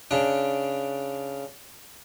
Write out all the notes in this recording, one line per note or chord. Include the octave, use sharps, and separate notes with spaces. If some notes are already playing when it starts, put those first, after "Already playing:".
C#3 D4